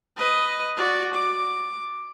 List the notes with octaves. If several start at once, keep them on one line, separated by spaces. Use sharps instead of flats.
B4 D#5
F#4 D5
D6